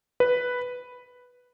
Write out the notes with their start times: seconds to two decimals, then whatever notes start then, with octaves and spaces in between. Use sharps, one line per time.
0.20 B4